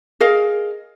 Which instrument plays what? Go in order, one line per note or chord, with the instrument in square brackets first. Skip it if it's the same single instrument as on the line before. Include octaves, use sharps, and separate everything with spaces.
[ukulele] G#4 A#4 D#5 F5